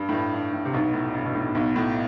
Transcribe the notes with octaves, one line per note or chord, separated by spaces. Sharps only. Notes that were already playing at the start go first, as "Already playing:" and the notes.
Already playing: G2
A2
G2
G2
A2
C3
B1 B2
A2
G2
B2
A2
B1 B2
A2